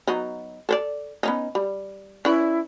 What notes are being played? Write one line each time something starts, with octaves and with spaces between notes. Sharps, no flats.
F#3 B3 D#4
A4 C5 D5
B3 C#4 D#4
G3
C#4 E4 B4 D5